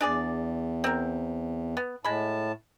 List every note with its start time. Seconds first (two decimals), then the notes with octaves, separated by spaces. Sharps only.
0.01 E2 D4 G#4 D5
0.84 C4 A#4
1.77 B3
2.04 A2 G#3 A5 B5